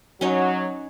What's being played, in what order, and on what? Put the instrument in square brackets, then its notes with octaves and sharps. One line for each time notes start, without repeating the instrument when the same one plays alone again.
[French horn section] F#3 [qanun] C#4 D#4 C#5